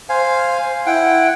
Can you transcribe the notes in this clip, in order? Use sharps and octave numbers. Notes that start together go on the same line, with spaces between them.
C5 F5 G#5
E4 F#5 G5